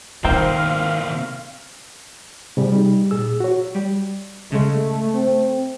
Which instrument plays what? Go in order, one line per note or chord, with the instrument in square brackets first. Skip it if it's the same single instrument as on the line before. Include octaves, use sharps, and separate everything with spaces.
[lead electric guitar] C3 A#3 [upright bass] D#3 [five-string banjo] C4 C5 [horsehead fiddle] F5
[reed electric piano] C3 G3 G4 G#4
G3 D#4
A#2 G#4 E6
F#4 C#5
[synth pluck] G3
[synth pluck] C#3 G#3 [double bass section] A3
[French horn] C4